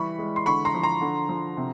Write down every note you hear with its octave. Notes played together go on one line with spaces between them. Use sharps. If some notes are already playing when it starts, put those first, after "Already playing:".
Already playing: E3 G3 B5 C#6
G#3
C6
D3 B5 C#6
A#5 C6
F3
A#5 C6
D3
F3
C3